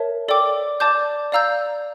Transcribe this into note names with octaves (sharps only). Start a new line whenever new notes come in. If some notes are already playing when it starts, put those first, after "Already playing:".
Already playing: A#4 C#5 E5 A5
A4 D5 G5 D6
D5 A5 D6 G6
D5 F5 A#5 E6 G6